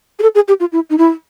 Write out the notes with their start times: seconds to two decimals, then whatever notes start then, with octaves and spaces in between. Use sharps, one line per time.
0.19 G#4
0.22 A4
0.35 G#4
0.48 G4
0.60 F4
0.72 E4
0.90 D#4
0.98 E4